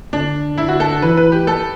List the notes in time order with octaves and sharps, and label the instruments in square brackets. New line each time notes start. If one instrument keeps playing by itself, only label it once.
[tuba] D3 [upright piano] D4
[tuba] D3 [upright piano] E4
[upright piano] F#4
A4
[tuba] E3 [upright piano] B4
[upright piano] B4
G4
A4